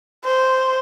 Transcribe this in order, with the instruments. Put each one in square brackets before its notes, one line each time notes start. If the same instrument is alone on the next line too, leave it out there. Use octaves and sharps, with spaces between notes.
[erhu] C5